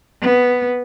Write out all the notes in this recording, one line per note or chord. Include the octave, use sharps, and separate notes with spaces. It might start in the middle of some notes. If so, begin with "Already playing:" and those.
B3